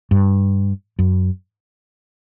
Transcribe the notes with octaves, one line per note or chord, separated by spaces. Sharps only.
G2
F#2